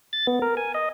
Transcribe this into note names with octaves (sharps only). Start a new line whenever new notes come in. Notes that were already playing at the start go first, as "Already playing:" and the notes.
A6
B3
A#4
G#5
D#5